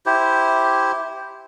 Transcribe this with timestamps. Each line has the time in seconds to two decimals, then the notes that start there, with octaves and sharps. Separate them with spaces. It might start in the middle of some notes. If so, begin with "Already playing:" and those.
0.06 E4 G4 C5